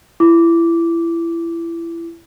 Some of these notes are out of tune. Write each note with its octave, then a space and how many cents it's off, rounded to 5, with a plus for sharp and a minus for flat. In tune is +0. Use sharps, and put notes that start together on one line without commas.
E4 +25 D6 -10